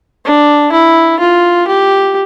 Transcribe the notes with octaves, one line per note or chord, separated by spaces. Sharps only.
D4
E4
F4
G4